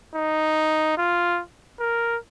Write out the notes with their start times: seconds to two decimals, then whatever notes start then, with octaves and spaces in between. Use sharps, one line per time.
0.15 D#4
0.98 F4
1.80 A#4